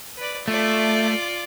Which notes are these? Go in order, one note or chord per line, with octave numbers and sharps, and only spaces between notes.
B4 D5
A3 F4 D5